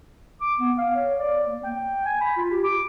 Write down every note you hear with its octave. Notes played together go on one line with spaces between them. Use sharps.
D6
B3
F5
C#5
D5
A#3
G5
G#5
B5
F4
G4
D6